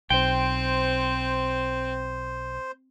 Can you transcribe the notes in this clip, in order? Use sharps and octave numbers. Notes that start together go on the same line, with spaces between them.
B1 C4 C5 G5